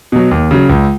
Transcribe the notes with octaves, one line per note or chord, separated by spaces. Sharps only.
B2 F#3
D#2
C#3 F#3
C#2